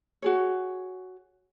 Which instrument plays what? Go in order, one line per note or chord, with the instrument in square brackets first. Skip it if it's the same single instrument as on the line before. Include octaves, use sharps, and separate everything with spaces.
[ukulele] F#4 G#4 C#5